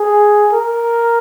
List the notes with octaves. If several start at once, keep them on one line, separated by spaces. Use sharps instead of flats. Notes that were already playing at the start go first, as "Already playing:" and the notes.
Already playing: G#4
A#4